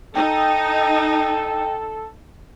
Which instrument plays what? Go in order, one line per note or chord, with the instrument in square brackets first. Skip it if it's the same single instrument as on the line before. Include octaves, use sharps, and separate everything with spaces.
[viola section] D#4 [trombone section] A4 [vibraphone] G5